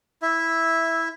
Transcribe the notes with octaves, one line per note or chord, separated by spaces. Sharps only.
E4 E5